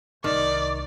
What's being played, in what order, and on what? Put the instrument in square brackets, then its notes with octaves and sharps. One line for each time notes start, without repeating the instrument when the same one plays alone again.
[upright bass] C2 [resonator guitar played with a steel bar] D#3 [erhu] D5